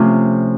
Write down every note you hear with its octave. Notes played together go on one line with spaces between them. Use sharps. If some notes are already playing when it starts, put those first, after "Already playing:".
Already playing: C3 F3 A3 C#4 F4